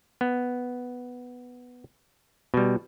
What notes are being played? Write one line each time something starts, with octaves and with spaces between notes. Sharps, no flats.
B3
B2 G3